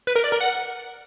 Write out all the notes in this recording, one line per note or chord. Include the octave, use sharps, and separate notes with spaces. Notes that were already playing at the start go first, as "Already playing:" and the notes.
B4
A#4
D5
A#4
F#5